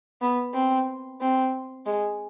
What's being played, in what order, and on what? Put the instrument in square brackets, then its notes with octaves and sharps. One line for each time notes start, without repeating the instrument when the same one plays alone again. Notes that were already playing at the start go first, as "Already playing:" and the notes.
[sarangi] B3
C4
C4
G#3